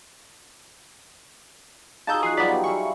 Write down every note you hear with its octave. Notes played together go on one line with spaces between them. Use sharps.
D#4 F#4 G#4 F5 A5 A#5 E6 G6
F3 G#4 F#6 C7
F#3 G3 B3 D5 B6
F#5
E5 F5 G#5 B5 C#6